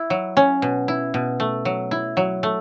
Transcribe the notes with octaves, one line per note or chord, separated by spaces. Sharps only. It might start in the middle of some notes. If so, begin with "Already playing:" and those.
Already playing: E4
F#3
C#4
B2
E4
B2
A3
F#3
E4
F#3
A3